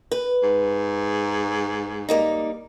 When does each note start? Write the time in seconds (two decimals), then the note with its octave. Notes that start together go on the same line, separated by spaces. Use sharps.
0.12 B4
0.43 G#2
2.09 G3 A#3 D#4